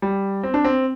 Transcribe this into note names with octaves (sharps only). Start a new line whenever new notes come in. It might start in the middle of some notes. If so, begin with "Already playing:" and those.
G3
C4
D4
C4